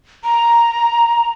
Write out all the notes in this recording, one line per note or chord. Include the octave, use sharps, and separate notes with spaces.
A#5